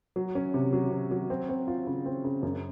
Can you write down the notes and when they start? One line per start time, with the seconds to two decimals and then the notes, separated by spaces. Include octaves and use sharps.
0.16 F#3
0.35 C#4
0.54 C3
0.73 F#3
0.91 C3
1.11 F#3
1.30 C4
1.49 C4
1.68 F4
1.87 C#3
2.06 C4
2.25 C#3
2.43 F#2